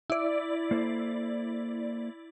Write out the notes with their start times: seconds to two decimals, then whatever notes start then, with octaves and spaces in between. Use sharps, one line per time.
0.10 E4 D5
0.71 A#3 A4 C5